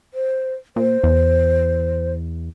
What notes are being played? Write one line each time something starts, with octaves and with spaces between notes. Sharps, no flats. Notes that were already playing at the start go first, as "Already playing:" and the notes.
C5
A#2 C5
E2